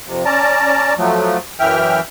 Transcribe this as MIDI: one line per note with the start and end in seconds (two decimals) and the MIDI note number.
0.07 0.24 41
0.07 0.24 48
0.25 0.94 61
0.25 0.94 74
0.25 0.94 81
0.25 0.94 82
0.98 1.38 53
0.98 1.38 54
0.98 1.38 57
1.60 2.00 42
1.60 2.00 52
1.60 2.00 76
1.60 2.00 79
1.60 2.00 89